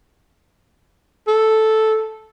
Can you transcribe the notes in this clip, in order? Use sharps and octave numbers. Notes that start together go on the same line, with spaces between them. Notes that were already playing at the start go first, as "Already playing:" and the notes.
A4